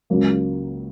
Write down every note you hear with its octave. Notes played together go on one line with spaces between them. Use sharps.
C#2 C#3 F#3 A#3